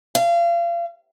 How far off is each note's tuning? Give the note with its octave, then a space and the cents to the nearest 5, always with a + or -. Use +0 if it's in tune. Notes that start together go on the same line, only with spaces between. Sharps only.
F5 -30